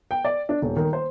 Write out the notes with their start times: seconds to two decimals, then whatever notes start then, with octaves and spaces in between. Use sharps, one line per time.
0.11 G5
0.25 D5
0.49 D4
0.62 D#1
0.76 D#3
0.93 C5